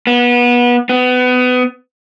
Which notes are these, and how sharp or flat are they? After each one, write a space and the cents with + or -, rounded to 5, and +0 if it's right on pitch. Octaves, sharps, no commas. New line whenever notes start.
B3 -25
B3 +25